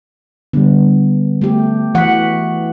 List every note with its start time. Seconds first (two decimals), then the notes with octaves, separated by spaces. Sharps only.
0.53 D3 G3 B3
1.42 A3 G4
1.95 E3 F#5 C#6 B6